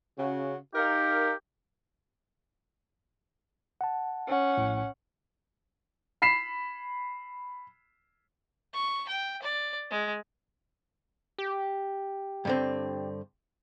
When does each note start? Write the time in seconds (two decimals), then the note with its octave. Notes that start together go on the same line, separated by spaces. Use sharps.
0.19 C#3 F#4
0.75 D#4 G4 A#4 F5
3.81 F#5 A5
4.28 C#4 F#5
4.57 A#1 A2
6.22 B5 B6 C7 E7
8.74 C#6
9.09 G5
9.42 D5
9.91 G#3
11.38 G4
12.45 G2 D3 C4